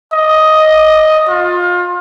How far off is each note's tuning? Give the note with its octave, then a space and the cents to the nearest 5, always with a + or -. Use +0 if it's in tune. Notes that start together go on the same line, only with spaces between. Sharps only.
D#5 +5
F4 +25